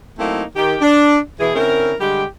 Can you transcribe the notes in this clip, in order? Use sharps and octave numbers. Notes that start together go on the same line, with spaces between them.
F#3 A3 A#3 C4 D#4 E4
D#3 G4
D4
B2 E3 G#4
D3 C4 C#4 E4 A#4
D3 G3 G#3 G4